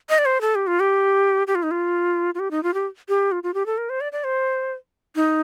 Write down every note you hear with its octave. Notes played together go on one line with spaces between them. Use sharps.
D#5
D5
C5
A4
G4
F4
G4
G4
F4
D#4
F4
F4
G4
D#4
F4
G4
G4
F4
F4
G4
A4
A#4
C5
D5
D5
C5
D#4